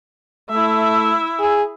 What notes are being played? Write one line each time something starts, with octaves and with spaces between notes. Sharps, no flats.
A3 E4 E5
G#4